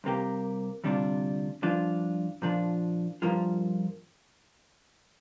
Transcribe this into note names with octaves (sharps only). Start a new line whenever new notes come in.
C2 C3 A#3 G4
D2 C3 G3 D4 F4
G2 F3 D4 F4
A#2 F3 D4 F4
G2 F3 A#3 F4